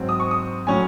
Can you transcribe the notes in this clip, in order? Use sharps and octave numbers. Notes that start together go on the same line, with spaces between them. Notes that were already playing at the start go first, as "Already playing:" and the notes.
Already playing: G#2 F#3 C4
D#6
C#6
D#6
A2 F#3 C#4 G#5